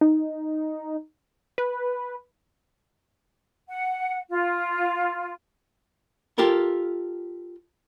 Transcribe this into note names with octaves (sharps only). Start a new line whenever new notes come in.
D#4
B4
F#5
F4
F4 G4 A4 A#4